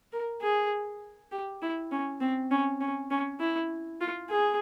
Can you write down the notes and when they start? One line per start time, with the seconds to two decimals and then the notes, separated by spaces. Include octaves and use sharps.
0.12 A#4
0.41 G#4
1.31 G4
1.62 E4
1.92 C#4
2.21 C4
2.51 C#4
2.81 C#4
3.11 C#4
3.40 E4
4.01 F4
4.30 G#4